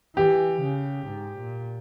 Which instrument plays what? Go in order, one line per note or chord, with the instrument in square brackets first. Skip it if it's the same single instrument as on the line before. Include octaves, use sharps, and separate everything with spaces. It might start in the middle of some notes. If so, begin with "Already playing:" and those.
[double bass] E3 [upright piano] G4
[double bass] C#3
G#2
A#2